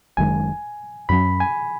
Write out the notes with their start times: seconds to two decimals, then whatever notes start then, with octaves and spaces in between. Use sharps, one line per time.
0.17 F#1 F#2 D#3 G#3 G#5
1.09 F#2 F#3 C#4 B5
1.40 G#5